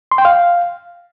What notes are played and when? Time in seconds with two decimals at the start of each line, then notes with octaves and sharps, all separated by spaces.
0.12 C6
0.18 G5
0.25 F5